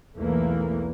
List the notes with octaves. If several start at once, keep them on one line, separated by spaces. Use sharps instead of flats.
B1 E2 E3 A3 A#3